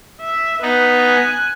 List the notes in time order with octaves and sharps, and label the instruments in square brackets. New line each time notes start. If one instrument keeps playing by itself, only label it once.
[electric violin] E5
[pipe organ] B3 D#4 [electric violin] B4
[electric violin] G#5 F#6